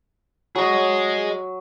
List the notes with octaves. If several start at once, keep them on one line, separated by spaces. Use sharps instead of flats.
F#3 G#4 D#5